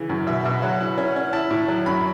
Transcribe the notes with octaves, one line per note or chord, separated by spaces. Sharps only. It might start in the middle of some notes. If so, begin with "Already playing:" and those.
Already playing: C#3 E3
F#2
B2 E5
B2 E5
F#3 F#5
E4
C#4
C#4
E4 A5
A2
F#3
F#2 B5